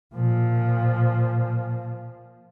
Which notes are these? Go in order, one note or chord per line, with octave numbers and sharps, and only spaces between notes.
A#2 F3